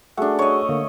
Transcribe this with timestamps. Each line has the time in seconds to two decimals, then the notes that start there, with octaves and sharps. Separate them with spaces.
0.17 A3 D4 F#4 G#4 F#5
0.39 C#5 D#5
0.69 D3 A#3